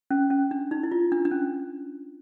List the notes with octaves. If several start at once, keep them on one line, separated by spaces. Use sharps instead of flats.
C#4
C#4
D4
D#4
E4
F4
D4
D4
C#4